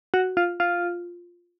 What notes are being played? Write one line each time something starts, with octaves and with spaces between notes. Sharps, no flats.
F#4
F4
F4